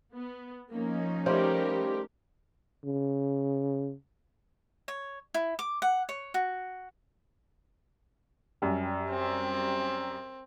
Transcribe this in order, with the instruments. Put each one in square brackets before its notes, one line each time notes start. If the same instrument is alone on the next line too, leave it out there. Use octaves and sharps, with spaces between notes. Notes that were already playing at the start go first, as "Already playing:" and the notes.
[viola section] B3
[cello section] F3 C#4 D#4 [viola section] A#3
[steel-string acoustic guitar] G3 C5 F5 [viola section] A3 G4 A#4
[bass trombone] C#3
[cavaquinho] C#5
E4
D6
F#5
C#5
F#4
[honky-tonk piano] F#2 G3
[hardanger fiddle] C4